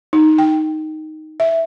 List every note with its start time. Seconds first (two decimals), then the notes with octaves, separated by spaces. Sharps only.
0.13 D#4
0.38 G5
1.40 E5